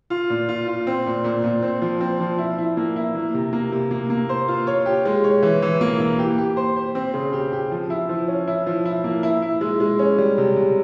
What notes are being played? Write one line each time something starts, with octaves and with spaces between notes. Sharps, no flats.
F4
A#2
F4
F4
C4
A#2
A#2
A#2
C4
F3
C4
F3
E4
E4
A#3
E4
A#3
C3
A#3
C3
A#3
A#3
C5
F4
C#5
G4
G#3
C#5
E3
E3
A#3
A#3
G4
G4
C5
C5
C4
C#3
G4
G4
F3
E4
F3
C#4
E4
F3
E4
A#3
E4
E4
G#3
G#3
C#4
G3
C3
C3